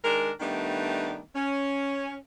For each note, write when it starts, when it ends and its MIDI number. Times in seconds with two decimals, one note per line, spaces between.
0.04 0.31 51
0.04 0.31 56
0.04 0.31 62
0.04 0.31 70
0.40 1.20 51
0.40 1.20 55
0.40 1.20 57
0.40 1.20 59
0.40 1.20 62
0.40 1.20 63
1.36 2.16 61